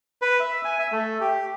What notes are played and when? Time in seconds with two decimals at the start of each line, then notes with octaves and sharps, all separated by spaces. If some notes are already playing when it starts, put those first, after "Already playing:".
0.22 B4
0.40 E5
0.65 G#5
0.79 E5
0.92 A3
1.21 G4